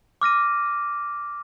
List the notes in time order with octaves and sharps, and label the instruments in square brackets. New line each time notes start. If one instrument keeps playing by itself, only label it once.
[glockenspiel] D6 F6 A#6 D#7